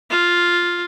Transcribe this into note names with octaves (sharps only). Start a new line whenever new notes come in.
F4